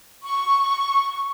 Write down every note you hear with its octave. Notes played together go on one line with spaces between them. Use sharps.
C#6